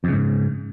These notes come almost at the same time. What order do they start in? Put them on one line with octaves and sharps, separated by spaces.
F2 C#3 G#2